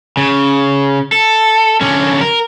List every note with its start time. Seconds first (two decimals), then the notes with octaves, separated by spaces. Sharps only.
0.17 C#3
1.12 A4
1.81 D3 C#4
2.21 A#4